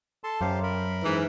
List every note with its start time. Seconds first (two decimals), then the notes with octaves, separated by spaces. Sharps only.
0.24 A4 A5 C6
0.41 F#2 G4 C5 F5
0.63 A#4 B5
1.03 G#2 E3